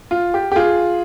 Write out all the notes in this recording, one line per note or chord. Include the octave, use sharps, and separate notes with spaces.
F4
G4
G4
F4 G#4